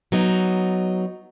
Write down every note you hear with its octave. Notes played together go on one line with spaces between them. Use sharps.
F#3 B3 D#4